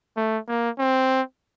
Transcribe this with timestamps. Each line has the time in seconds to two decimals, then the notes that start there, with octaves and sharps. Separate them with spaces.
0.17 A3
0.48 A#3
0.78 C4